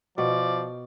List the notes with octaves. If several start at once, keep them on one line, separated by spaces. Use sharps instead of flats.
B2 F3 D5